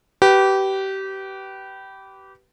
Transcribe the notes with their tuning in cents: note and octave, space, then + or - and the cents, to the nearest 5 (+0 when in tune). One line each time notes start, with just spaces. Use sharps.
G4 -25 B4 +0